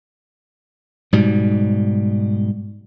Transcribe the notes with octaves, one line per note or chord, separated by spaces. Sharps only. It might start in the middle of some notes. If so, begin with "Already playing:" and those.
G#2 B2 G3